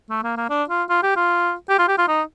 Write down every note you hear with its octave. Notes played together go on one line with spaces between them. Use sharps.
A3
A#3
A#3
D4
F4
F4
G4
F4
G4
F4
G4
F4
D#4